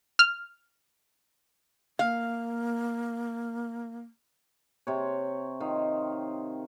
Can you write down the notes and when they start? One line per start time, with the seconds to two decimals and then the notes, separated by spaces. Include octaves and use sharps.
0.19 F6
1.99 A#3 F5
4.87 C3 C#5
5.60 D#3 F4